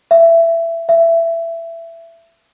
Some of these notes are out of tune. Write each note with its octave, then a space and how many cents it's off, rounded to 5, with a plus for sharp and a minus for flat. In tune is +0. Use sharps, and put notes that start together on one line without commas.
E5 +20
E5 +20